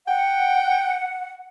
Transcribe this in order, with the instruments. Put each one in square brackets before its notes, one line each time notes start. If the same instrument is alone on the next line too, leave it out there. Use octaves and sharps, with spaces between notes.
[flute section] F#5 [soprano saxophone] G5